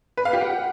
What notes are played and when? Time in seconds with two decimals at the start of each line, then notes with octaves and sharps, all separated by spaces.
0.17 B4
0.25 F5
0.33 G4
0.41 F#5